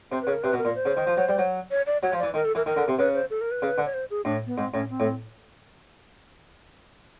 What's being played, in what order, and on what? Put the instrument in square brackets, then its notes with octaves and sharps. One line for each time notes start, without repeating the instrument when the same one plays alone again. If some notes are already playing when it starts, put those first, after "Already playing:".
[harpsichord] C3 [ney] C5
[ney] B4
[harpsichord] C#3
[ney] A#4
[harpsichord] C3 [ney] B4
[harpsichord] B2
[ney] A#4
[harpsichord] A#2
[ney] C5
[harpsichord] C#3
D#3
F3
F#3
G3
F#3
[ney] C#5
D5
[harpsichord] F#3 [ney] C#5
[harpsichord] F3
[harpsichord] E3 [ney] D5
[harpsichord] D#3 [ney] A#4
[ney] A4
[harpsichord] E3 [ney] A#4
[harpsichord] D#3 [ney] A#4
[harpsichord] D3
C3
[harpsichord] C#3 [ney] B4
[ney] C5
A4
A#4
B4
[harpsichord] C#3
D3
[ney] C#5
C5
G#4
[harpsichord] A2 [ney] D4
[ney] B3
[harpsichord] G#2 [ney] C4
[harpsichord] A2 [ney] C#4
[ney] C4
[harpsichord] A2